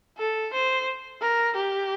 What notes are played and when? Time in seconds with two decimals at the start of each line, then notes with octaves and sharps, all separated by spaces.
0.18 A4
0.53 C5
1.21 A#4
1.56 G4